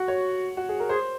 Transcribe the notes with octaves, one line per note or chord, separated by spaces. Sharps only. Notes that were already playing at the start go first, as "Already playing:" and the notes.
Already playing: F#4 F#5
C#5
F#4
G#4
A#4
G#4 C5